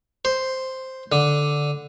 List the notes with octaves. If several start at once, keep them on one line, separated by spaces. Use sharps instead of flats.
C5
D3